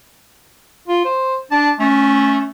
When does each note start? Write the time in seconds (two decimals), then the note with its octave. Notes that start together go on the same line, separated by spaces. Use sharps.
0.88 F4
1.05 C5
1.51 D4 A5
1.79 A3 C#4